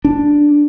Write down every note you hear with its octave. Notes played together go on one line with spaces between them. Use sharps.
D4